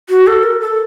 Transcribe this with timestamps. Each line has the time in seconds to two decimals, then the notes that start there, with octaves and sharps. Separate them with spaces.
0.09 F#4
0.27 A4
0.43 A#4
0.61 A4